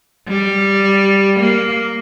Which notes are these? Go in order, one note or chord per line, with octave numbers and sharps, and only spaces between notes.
G3
A#3